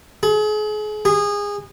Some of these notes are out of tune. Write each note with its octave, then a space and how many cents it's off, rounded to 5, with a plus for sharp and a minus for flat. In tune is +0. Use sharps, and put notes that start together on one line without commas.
G#4 +35
G#4 -25